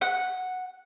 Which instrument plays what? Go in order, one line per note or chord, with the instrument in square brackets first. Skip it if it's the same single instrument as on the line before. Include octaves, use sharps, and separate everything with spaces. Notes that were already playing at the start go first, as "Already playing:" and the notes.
[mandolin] F#5